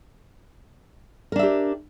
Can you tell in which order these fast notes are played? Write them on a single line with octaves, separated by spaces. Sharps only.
A#4 D4 E5 G4